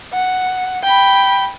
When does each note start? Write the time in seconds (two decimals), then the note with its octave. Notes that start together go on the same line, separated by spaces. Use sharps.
0.13 F#5
0.83 G5 B5